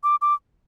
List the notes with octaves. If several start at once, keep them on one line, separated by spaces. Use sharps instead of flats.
D6
D6